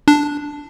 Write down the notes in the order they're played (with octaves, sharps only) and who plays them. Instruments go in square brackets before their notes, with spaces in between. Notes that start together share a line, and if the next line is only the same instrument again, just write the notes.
[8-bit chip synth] D4